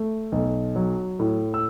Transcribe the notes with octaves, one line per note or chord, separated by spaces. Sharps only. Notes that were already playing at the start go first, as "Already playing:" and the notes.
Already playing: A3
B1
F#3
A2
E6